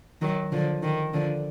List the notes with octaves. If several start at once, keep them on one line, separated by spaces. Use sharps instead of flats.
D#3 F#3
D3 F3
D#3
D3 F3